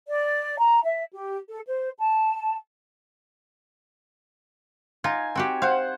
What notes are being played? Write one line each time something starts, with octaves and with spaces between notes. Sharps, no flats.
D5
A#5
E5
G4
A4
C5
A5
D#4 F4 G#5
C4 F#4 G4
C5 F5 F#5